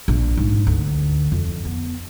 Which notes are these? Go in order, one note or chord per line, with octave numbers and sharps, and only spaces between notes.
A#1
G#2
D2
F2
B3